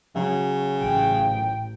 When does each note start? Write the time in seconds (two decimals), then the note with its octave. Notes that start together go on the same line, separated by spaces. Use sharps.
0.16 C#3 F#3
0.81 A1 G5